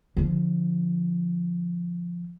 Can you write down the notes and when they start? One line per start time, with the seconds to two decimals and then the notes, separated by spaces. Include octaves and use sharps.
0.17 D3 F3